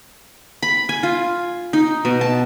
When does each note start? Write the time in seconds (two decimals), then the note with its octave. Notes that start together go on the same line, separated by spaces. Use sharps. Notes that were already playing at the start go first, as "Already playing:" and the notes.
0.62 B5
0.89 G#5
1.03 F4
1.73 D#4
2.05 B2
2.21 A5